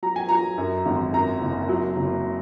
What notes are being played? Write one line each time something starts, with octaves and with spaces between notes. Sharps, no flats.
F#3 A#5
G#5
F#3 A#5
F#2
G#1
F#2 A#5
F#1
F#3
F#1